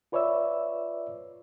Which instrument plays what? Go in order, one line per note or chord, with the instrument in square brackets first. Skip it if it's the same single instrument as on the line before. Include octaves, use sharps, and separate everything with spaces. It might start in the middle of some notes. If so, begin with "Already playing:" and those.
[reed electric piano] F4 B4 C#5 D5 E5 E6